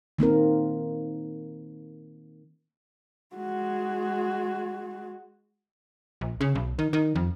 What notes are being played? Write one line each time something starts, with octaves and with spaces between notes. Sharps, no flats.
D#3 A#3 C4 A#4
G#3 F#4
A#1
C#3
B1
D#3
D#3
F2